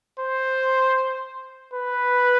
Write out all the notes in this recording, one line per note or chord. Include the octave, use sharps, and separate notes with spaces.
C5
B4